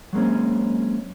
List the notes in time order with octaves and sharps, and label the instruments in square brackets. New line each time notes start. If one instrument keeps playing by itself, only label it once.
[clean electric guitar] F#3 G#3 A#3 C4 C#4